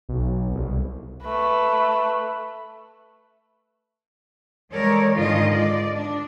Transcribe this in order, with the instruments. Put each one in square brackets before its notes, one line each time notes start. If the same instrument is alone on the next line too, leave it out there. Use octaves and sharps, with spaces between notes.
[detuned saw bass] B1
C2
[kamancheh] A3 B4
[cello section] E3 G#3 A4 A#4 C#5 D5
G#2 D3 D#3 G#3 F4 D#5
D5
D4